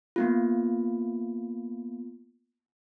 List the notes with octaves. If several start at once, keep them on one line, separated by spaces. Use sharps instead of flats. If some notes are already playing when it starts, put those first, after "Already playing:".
A#3 B3 F4